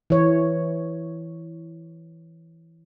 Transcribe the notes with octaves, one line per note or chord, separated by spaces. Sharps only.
E3 C#5